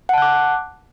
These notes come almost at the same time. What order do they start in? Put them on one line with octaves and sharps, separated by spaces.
F#5 A5 F#6 D6